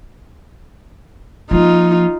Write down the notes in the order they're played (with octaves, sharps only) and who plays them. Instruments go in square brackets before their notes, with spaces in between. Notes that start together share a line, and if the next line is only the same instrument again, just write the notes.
[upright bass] F3 A#3 [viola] D#4 F4